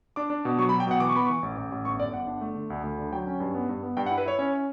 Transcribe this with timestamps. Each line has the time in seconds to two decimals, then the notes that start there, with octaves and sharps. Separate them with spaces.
0.16 D4 D6
0.30 D4
0.45 B2
0.59 F#3 C#6
0.69 B5
0.73 F#3
0.80 G5
0.87 B2 F#5
1.00 E3 D6
1.09 C#6
1.15 B3 B5
1.25 E3 C#6
1.43 A1
1.58 A1
1.72 A1
1.85 G1 C#6
1.99 G1 D5
2.14 G1 F#5
2.27 D4
2.41 A3
2.55 D3
2.70 D2
2.84 D2
2.99 D3
3.12 F#3 G5
3.27 C#4
3.40 G2
3.54 B3
3.69 G2
3.83 B3
3.97 G2 G5
4.06 F#5
4.11 E4
4.18 B4
4.25 E4 C#5
4.39 C#4 C#5